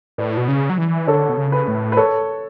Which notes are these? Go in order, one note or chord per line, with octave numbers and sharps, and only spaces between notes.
A2 B4 D5
B2
C#3
F#3
E3
D3 A4 C#5
B2
C#3
B4
A2
B4
A4 C#5